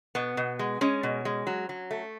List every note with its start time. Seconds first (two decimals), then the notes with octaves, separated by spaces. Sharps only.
0.15 B2 B3
0.37 B2
0.59 G#3
0.81 G#3 C#4
1.03 B2
1.25 G#3
1.47 F#3
1.69 F#3
1.91 A3